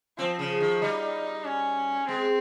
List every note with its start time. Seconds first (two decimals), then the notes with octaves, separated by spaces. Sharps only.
0.18 F3 C4
0.39 C#3
0.60 D#3
0.81 G3 D#4
1.44 C#4
2.08 G#3 C4